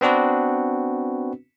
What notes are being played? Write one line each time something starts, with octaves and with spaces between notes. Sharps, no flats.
B3 C4 D4 F#4 B4